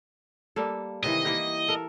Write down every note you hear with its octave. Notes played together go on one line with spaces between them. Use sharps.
G3 A#3 A4
C3 D#3 E3 D#5
E3 A#3 G4
A4 A#4